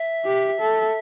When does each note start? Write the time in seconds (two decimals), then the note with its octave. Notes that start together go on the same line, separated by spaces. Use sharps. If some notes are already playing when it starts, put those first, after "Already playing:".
Already playing: E5
0.25 G4
0.60 A4